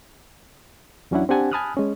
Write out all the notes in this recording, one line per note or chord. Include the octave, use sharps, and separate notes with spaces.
E2 F#3 C#4 D4 E4 F#5
C4 D4 G4 F#5 G#5 A5
G#5 A5 B5 D#6 F6 F#6
G#3 C#4